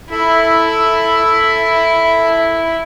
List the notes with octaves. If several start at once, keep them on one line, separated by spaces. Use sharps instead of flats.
E4 A4 E5 B5